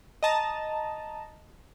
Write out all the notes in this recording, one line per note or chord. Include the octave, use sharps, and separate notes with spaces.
D#5 A5 A#5